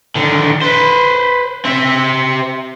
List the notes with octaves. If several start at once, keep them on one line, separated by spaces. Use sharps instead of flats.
D3 D#3
B4 C5
C4 E5